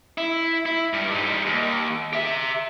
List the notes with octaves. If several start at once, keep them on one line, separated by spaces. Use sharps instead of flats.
E4
E4
G2
G3 D#4
D#2
G4 E5